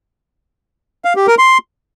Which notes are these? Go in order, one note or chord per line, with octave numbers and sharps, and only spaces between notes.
F5
G4
A#4
C6